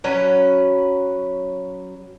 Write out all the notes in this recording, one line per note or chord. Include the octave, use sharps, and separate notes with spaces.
F#3 C#4 B4